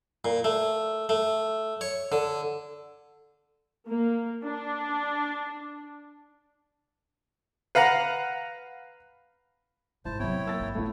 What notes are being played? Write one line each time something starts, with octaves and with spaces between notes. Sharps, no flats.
A#2
A3
A3
C#5
D3
A#3
D4
B4 F5 F#5 A#5
G#1 G#2 E4 C5 A5
E2 C3 F#3 B3 E4 C#5 G5
A#3 E6 A6
G#1
A2 E3 A3 B3 E4